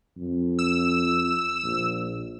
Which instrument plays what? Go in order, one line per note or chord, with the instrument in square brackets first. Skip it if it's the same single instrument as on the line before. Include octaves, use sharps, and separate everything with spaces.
[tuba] F2
[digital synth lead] E6
[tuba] A#1